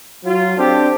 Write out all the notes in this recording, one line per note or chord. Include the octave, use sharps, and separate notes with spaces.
F#3 F4
C4 D4 G4 A4